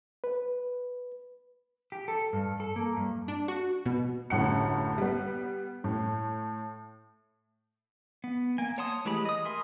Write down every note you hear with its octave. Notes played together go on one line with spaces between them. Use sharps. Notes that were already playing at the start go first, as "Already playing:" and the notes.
B4
G4
A4
G2
A4
A#3
G2
D4
F#4
B2
G1 F#2 A2 F#5 C#7
G3 B3
A2
B3
A#3 G#5
C#5 F#5 A5 C6 D#6
E3 G#3 A3 G4 B5
D#5 D#6
A#4 E5 G#5 B5 C6